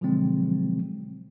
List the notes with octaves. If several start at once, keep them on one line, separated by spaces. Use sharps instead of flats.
B2 D3 F3 F#3 G#3 C4